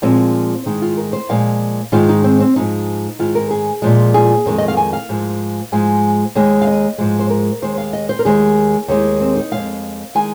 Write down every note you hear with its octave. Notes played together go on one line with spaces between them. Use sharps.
A#2 F3 G#3 C4
G#2 D#3 G#3 D#4
F4
A#4
C5
A#2 F3 G#3 F5
G#2 D#3 G#3 F4
D#4
C4
C4
G#2 F3 G#3 D#4
G#2 D#3 G#3 F4
A#4
G#4
A#2 F3 G#3
G#4
F2 D#3 G#3
D#5
F5
G#5
F5
G#2 F3 G#3
G#2 F3 G#3 G#5
D#2 D#3 G#3
F5
D#5
G#2 F3 G#3
C5
A#4
D#2 D#3 G#3 C5
F5
D#5
C5
A#4
D#2 D#3 G#3 G#4
D#2 D#3 G#3
C4
D#4
F2 F3 G#3 F5
D#3 G#3 G#5